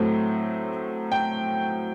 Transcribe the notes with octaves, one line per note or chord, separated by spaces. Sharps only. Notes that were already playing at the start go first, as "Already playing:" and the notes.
Already playing: A2 F#3 A3 C4
G5